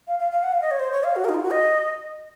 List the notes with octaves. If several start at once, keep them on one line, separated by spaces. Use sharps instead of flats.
F5
F5
F5
F#5
F5
D#5
C#5
C5
C#5
F5
F#4
A#4
D#4
F4
F#4
D#5